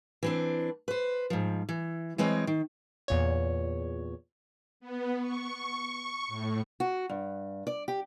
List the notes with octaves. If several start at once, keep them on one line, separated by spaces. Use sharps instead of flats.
E3 C4 D4
B4 C5
G#2 F3
E3
E3 G#3 C4 C#5 D#5
D#3
E2 A#2 C#5
B3
C#6
A2
F#4
G2
D5
G4